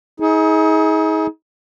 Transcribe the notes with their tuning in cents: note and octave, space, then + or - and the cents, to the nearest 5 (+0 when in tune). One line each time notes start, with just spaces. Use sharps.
D#4 +40 G#4 +15